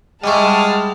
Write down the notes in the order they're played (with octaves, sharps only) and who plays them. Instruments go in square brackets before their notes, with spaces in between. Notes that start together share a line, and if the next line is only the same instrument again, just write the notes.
[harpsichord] G3 E4 [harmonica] G#3 [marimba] D#5 C#6 [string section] F#5 A5 F6